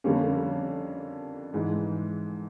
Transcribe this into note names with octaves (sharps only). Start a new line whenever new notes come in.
F2 D3 G3 A#3 C#4
G#2 E3 G#3